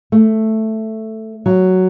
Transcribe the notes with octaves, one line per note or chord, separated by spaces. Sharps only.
A3
F#3